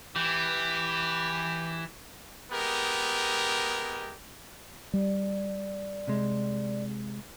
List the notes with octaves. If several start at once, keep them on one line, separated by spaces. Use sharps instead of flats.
E3 G4
G#3 B3 G4 A#4
G3 D5
C3 G#3